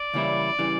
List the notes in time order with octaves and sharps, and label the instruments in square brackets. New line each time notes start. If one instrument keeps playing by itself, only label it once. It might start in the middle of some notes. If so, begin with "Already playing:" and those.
Already playing: [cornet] D5
[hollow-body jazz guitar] C#3 E3 G3 A#3 E4
C#3 E3 G3